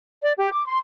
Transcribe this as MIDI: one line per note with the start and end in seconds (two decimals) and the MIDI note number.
0.22 0.32 74
0.38 0.49 67
0.52 0.65 86
0.65 0.77 84